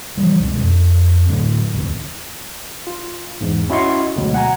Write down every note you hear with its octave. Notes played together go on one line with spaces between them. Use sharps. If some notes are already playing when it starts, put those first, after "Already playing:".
E3 F3 G3
C#2 B2 G#3
F2
A2 D3 F#3
G#1 D#2 D3
F4
E2 G#2
C#4 E4 F#4 D#5 C6 C#6
D2 B2 F#3 G#3
F#5 G#5 A#5